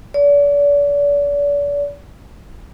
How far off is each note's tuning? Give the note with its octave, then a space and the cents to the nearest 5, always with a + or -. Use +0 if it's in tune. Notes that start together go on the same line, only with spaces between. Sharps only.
D5 -40